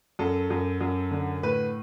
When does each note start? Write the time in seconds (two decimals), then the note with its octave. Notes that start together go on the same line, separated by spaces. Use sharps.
0.19 F#2 A4
0.50 F#2
0.81 F#2
1.11 D3
1.43 A2 B4